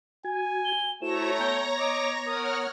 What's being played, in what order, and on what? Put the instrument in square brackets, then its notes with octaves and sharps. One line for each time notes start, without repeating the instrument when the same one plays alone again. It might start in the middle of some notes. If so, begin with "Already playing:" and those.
[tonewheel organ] F#4 G#6 [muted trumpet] G#5
[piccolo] G7
[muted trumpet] A3 [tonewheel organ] E4 F#4 C5 [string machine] C#5 A#5 A#6 [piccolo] E7
[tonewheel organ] B3 [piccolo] G5
[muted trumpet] D#5 [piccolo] D6
[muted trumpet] A#4 [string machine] C#5 F#5 F6 [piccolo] D#6